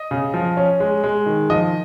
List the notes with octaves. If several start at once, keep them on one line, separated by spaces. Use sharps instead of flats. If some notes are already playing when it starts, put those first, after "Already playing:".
Already playing: D#5
C#3
F3
C#4
G#3
G#3
D#3
F3 D#5